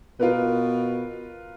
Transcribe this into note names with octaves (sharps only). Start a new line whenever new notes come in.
B2 F4 A#4 B4